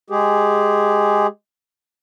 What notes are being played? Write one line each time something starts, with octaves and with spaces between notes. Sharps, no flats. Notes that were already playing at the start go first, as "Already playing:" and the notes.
G#3 G4 G#4